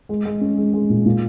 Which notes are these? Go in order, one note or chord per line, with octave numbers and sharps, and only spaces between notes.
G#3
G#3
C#4
G#3
G#3
A#2
A#2